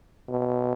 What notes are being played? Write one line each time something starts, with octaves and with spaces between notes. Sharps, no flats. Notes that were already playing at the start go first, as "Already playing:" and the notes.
B2